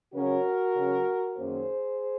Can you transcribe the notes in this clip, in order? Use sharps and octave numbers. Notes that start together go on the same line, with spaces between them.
C#3 F#3 C#4 F#4 A#4
C#3 F#3 C#4
F#2 D#3 A#3 C#4 G#4 C5